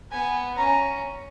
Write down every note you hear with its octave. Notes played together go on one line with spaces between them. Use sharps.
B3 G#5
C#4 A#5